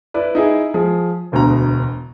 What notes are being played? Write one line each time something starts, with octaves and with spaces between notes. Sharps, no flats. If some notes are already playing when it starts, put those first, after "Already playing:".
E4 B4 D5
D#4 E4 G#4
F3 G#4
E1 D2 B2 A#5